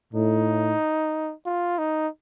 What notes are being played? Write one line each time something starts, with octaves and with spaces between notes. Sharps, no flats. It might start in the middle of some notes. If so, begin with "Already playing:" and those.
A2 D#4
F4
D#4